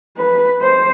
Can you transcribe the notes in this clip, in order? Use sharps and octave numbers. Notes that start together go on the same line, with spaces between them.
B4
C5